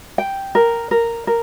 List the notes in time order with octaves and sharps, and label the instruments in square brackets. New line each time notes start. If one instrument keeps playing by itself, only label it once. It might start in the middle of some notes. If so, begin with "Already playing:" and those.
[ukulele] G5
A#4
A#4
A#4